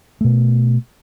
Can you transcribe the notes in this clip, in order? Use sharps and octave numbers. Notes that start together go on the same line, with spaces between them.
B2 A3